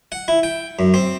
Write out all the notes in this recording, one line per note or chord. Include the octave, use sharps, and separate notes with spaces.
F#5
E4
G5
F#2
C4